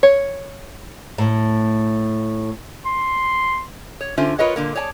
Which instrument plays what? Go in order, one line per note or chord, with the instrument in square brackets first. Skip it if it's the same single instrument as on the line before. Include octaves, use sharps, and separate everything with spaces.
[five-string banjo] C#5
[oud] A2
[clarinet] C6
[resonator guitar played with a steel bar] C#5
D3 C#4 F4 C5 E5
F4 A#4 B4 C#5 D#5 F#5
A#2 D3 A#3
G#4 C#5 D5 G#5 A5